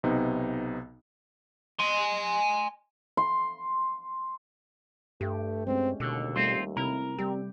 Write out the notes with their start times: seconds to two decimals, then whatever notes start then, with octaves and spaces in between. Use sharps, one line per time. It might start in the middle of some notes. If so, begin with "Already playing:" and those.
0.03 B1 C3 B3 D#4
1.80 G#5 C6
3.17 C6
5.21 G2 A3 G4
5.67 G#3 A3 C4 C#4
6.00 D#2 B2 D3
6.36 G3 A3 C4 F4 C5
6.77 C3 E4 A#4
7.18 G3 C4 G4